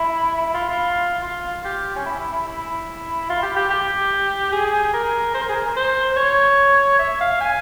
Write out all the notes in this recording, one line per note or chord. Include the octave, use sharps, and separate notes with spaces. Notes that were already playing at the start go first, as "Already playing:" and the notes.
Already playing: E4
E4
F4
F4
F4
G4
C#4
E4
E4
E4
E4
F4
G4
G4
G4
G#4
A#4
C5
A#4
G#4
A#4
C5
C#5
E5
F5
G#5